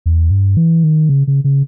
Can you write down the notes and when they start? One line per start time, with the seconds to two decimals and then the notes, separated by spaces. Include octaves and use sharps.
0.06 E2
0.31 G2
0.57 E3
0.84 D#3
1.09 C#3
1.27 C#3
1.44 C#3